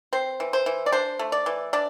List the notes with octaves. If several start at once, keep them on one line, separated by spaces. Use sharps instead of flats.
C4 C5
E3
C5
E3
D5
D4 C5
A3
D5
E3
D4 D5